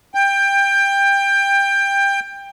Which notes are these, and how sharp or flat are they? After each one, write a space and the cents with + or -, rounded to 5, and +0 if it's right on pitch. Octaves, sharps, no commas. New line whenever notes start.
G5 +20